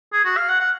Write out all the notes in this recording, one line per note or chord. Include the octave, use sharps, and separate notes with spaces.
G#4
F#4
F5
F#5
F#5